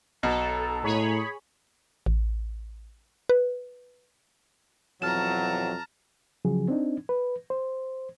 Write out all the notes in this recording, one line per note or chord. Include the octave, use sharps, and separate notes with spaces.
B1 B2 A4 A#5
A2 G#4 C#5 B5
A1
B4
F2 B2 E3 F#3 A5 A#5 F6 E7
C#3 F3 F#3 G#4
C4 D4 D#4
B4
C5